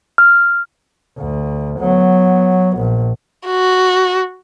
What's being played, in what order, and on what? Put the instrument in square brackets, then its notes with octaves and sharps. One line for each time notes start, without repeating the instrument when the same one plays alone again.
[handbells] F6
[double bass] D2
F#3 B3
A#1
[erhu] F#4